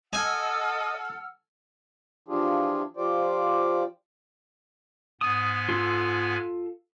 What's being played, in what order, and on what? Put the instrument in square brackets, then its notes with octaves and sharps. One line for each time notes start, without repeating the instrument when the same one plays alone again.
[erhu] A4 [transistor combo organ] D#5 [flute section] F#5 E6 F6 [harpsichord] G#5
[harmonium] E3 F3 D4 F4 G4 G#4
F3 F4 G4 C5 D5
[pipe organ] G#2 B3 G#5 [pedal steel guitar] D#6
[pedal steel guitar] F4 A4